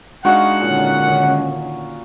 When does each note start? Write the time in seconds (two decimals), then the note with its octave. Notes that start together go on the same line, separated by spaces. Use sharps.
0.25 G#3 D4 D#4 F#4 F5 F#5
0.61 A#2 D3 D#3 C#4